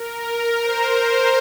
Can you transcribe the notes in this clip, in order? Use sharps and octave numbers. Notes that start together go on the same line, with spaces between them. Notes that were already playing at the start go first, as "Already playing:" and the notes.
Already playing: A#4
A#4
C5
C5